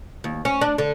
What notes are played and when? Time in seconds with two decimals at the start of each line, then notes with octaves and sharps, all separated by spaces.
0.24 D#2
0.45 C#4
0.61 D4
0.78 D3